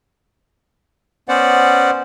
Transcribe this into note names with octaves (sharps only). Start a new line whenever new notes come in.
B3 C#4 C5 D5 F#5